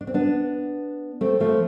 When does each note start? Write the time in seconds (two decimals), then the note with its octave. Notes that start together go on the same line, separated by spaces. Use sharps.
0.01 D4
0.07 C4
0.14 B3 D4
1.21 A3 C4
1.40 F3 A3